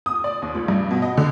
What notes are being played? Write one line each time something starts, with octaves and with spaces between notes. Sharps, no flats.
D#6
D5
D#2
C#2
G2
B2
D#5
D3